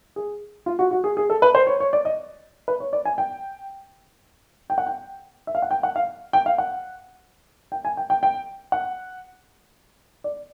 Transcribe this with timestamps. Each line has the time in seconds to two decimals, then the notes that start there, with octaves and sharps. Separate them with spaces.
0.16 G#4
0.66 F4
0.79 F#4
0.91 F#4
1.04 G#4
1.17 G#4
1.30 A4
1.42 B4
1.55 C5
1.67 C#5
1.80 C#5
1.93 D5
2.05 D#5
2.68 B4
2.80 C#5
2.93 D5
3.05 G#5
3.18 G5
4.70 G5
4.78 F#5
4.87 G5
5.47 E5
5.55 F5
5.62 F#5
5.71 G5
5.83 F#5
5.96 F5
6.33 G5
6.46 F5
6.58 F#5
7.72 G5
7.85 G#5
7.97 G5
8.10 G5
8.23 G5
8.72 F#5
10.24 D5